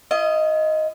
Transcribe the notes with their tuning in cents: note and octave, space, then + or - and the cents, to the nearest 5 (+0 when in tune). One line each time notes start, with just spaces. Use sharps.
F4 -45 D#5 +5